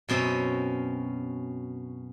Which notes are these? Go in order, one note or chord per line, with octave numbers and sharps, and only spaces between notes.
F#2 B2 C4 C#4 E5 A#5